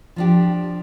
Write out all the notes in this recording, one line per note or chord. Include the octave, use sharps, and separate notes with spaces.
F3 D4 G4